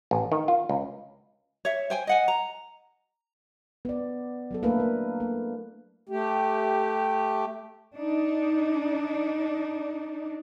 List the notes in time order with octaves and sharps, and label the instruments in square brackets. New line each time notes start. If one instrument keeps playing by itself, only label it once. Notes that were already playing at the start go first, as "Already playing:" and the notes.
[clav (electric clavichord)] A1
D#3
F4
C#2
[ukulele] C#5 E5
C5 G5 G#5
D#5 F#5 G#5
A#5
[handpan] B3 D5
F#3 B3 A4
A3 A#3 D4 E4 A#4 B4
A#3
A#3
[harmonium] A3 G4
[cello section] D4 D#4